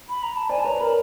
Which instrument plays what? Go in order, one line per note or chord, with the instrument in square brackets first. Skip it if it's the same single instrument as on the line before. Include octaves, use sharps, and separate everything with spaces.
[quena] B5
A#5
A5
[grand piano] C5 D5 [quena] G#5
[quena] A5
[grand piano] B4 C#5 [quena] A#5
[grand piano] A#4 C5 [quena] B5